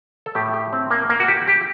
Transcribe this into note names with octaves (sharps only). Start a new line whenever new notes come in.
A4
A2 G4
G4
C4
A#3
A#3
F#4
G4
G4